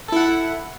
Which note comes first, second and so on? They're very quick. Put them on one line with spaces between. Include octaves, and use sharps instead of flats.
A4 E4 F#5